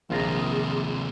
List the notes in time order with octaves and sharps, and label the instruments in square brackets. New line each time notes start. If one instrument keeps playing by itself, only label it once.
[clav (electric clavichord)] A#1 F4 A#5 [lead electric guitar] D#2 C3 [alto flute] G#4